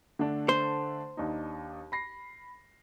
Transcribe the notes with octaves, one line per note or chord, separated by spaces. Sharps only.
D3 A3 D4
C5
D#2 D4 D#4
B5 A#6 C7